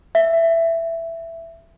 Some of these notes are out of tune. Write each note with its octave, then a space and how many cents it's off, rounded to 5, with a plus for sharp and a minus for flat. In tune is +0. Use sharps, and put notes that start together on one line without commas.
E5 +10